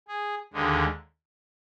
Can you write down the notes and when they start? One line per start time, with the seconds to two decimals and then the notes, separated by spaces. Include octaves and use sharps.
0.08 G#4
0.53 D#2 D3 G#3